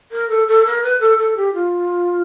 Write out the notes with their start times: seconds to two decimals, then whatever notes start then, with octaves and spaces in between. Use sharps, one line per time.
0.12 A#4
0.29 A4
0.47 A4
0.66 A#4
0.83 B4
1.00 A4
1.18 A4
1.37 G4
1.54 F4